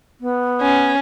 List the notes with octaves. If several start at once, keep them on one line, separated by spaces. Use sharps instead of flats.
B3
C#4